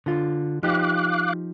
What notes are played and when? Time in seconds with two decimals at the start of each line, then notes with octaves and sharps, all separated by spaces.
0.06 D3 F4
0.63 F3 D#4 G4 F5 D6 F#6